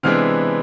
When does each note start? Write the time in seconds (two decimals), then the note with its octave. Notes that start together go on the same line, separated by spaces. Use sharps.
0.03 C3 E3 G#3 B3 D4 F6